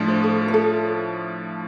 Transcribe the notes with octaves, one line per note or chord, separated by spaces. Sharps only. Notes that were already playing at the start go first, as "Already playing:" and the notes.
Already playing: A2 F3 A3 D4
C5
A4
B4
A4